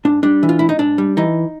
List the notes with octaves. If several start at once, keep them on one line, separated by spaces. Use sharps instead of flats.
G#2 D4
G3 D4
E3
F4
G#2 E4
D#4
G#2 D4
G3
E3 D#4